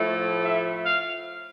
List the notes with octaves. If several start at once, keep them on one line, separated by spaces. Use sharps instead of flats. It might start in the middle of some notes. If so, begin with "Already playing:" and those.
Already playing: A2 F3 A3
E5
F5